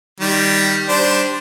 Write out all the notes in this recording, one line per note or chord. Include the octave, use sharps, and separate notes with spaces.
D#3 G3
G3 D4 C5